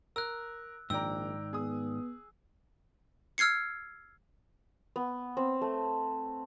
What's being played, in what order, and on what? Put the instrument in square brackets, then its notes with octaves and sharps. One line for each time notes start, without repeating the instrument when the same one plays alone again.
[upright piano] A#4 [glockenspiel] E6 F#6
[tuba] A#1 [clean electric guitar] G#2 D#3 D5 [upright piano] G5 A#5 [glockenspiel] E6
[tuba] B3 [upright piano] G#4 D#6
[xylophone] E6 F6 G#6 C7 C#7
[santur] B3
C4
A3